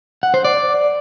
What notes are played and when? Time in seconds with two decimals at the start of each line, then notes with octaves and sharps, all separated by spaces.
0.23 F#5
0.34 C5
0.44 D5